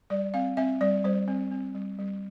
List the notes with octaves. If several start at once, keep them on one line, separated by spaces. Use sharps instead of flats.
G3 D5
C4 F5
C4 E5
G3 D5
G3 C5
C4
C4
G3
G3